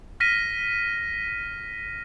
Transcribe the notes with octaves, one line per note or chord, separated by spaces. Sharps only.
F6 A#6 B6 D#7